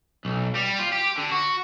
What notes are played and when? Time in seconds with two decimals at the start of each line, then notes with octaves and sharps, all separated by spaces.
0.25 B1
0.55 G3
0.79 F4
0.92 G4
1.18 D3
1.32 F#4